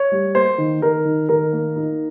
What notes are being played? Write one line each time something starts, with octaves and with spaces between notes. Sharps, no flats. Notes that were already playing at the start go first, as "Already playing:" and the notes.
Already playing: C#5
G3
A#3 C5
D#3
D#3 A#4
D#3
D#3 A#4
A#3
D#4